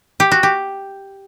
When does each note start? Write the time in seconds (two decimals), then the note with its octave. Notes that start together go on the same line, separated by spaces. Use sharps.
0.20 G4
0.32 F#4
0.43 G4